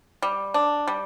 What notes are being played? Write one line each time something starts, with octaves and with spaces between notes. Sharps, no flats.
G3
D4
G3